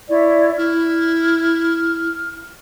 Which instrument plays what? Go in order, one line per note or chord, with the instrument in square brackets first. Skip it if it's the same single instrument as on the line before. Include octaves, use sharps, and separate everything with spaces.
[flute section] E4 C#5 D5
[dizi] E4 [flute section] F6